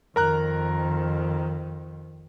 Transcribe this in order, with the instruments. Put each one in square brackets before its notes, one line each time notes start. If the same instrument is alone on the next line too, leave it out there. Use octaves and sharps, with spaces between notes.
[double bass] F2 D#3 [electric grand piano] A#4 A#5 F#6